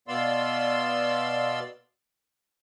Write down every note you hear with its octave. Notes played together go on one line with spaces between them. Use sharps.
B2 B3 D5 F5 C6 E6